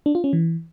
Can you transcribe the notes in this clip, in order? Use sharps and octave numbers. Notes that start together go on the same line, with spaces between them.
D4
F4
C#4
E3